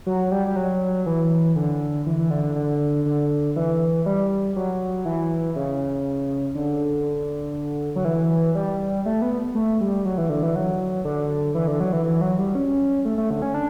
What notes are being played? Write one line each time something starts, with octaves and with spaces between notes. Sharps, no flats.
F#3
G3
G3
F#3
E3
D3
E3
E3
D3
D3
D3
D3
E3
G3
F#3
E3
C#3
D3
F#3
E3
G3
A3
B3
A3
G3
F#3
E3
D3
E3
F#3
D3
E3
D3
F#3
E3
E3
F#3
G3
C#4
A3
A3
D3
C#4
D4